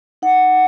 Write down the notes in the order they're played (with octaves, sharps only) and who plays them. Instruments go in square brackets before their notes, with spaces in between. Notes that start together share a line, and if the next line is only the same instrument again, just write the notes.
[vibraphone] D#4 F#5